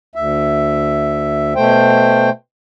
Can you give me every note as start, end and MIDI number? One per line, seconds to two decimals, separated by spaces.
0.15 1.54 38
0.15 1.54 76
1.56 2.30 47
1.56 2.30 57
1.56 2.30 72
1.56 2.30 79